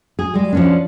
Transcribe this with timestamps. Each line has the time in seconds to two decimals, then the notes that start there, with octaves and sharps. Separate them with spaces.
0.19 G#4
0.34 G3 G#3
0.53 F3 C#4 D4